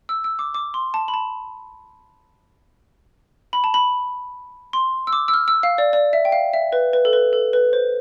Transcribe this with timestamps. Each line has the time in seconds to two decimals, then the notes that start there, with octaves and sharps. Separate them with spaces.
0.09 E6
0.24 E6
0.39 D6
0.54 D6
0.74 C6
0.94 A5
1.08 B5
1.14 A5
3.53 B5
3.64 A5
3.74 B5
4.73 C6
5.07 E6
5.13 D6
5.28 E6
5.34 F6
5.48 E6
5.63 F5
5.78 D5
5.93 D5
6.13 E5
6.25 G5
6.32 F5
6.54 E5
6.72 B4
6.93 B4
7.05 A4
7.13 B4
7.33 A4
7.53 B4
7.73 C5